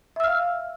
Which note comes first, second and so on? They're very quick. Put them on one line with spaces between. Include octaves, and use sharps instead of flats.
E5 E6 F6 F5